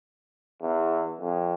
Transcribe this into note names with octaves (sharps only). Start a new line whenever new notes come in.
E2
F2